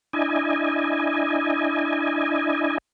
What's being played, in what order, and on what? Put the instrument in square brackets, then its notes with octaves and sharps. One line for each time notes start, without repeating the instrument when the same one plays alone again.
[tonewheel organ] D4 E4 D#5 G#5